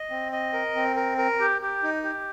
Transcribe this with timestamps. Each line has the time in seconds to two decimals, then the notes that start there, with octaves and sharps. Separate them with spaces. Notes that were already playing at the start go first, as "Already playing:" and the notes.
Already playing: D#5
0.10 C4
0.32 D#5
0.53 A#4
0.75 C4
0.96 A#4
1.18 A#4
1.40 G4
1.62 G4
1.83 D#4
2.03 G4